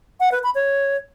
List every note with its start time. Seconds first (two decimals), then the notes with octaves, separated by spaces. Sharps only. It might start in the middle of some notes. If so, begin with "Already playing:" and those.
0.20 F#5
0.32 B4
0.43 B5
0.55 C#5